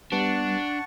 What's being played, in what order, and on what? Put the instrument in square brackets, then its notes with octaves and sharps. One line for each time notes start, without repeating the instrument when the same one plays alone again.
[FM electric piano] G3 B3 [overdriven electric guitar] D4 [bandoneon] F#5 A5 C#6